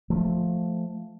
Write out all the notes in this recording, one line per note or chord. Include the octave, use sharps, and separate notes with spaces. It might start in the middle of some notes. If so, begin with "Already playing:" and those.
F3 A3